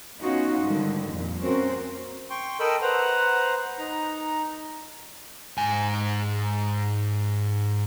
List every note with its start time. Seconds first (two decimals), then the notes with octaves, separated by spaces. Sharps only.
0.19 B3 C#4 D#4 F4 F#4
0.62 G#2 D3 D#3 G3
1.10 F2 A#2
1.41 A#3 C4 C#4 F#4 A#4 C5
2.30 G5 C6 C#6
2.60 A4 A#4 D#5 G5 B5 E6
2.82 B4 C5 F#5 A#5
3.78 D#4 A#5
5.58 G#2 G#5